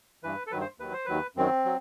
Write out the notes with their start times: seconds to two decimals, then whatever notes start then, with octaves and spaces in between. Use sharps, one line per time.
0.23 G2 E3 B4
0.47 A4
0.51 G2 D#3 F#3 B4
0.61 C5
0.80 D#2 D#3 F#3 B4
0.93 C5
1.05 D#2 D#3 F#3 B4
1.36 F#2 D#3 F#3 C4
1.65 F#3